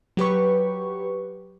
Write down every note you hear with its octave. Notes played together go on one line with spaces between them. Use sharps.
F#3 G4 B4 C#6